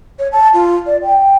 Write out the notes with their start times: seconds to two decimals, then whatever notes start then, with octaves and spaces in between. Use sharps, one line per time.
0.19 C#5
0.32 A5
0.54 F4
0.86 D5
1.03 G5